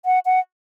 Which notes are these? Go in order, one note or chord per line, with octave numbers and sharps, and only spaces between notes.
F#5
F#5